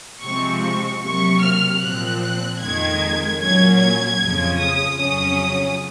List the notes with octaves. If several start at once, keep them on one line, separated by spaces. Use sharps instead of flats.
C3 F3 G#3 C4 C#6
C#6
C3 F#3 A#3 C#6
F6
A#2 F3 C4 F#6
F2 D#3 G#3 G#6
A#2 F#3 A#3 C#4 G#6
G#6
F2 C#3 F3
D#6
F2 C#3 F#3 C#4 D#6